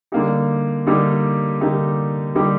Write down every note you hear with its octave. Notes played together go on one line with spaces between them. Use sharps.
D3 G3 A#3 D#4 G4
D3 G3 A#3 D#4 G4
D3 G3 A#3 D#4 G4
D3 G3 A#3 D#4 G4